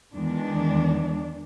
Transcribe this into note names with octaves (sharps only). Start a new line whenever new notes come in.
E2 D#3 G#3 D4